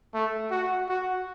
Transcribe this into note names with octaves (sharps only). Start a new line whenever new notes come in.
A3
F#4
F#4